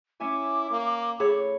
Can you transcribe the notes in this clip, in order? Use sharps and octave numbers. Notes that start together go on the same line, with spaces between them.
C#4 E4 E5 G#5 D6
A#3
A2 G#4 A4 C#5 B5